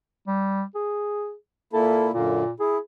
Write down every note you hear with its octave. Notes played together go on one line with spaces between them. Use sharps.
G3
G#4
A#2 A#3 E4 A4
F#2 A#2 D3 A#3
E4 G#4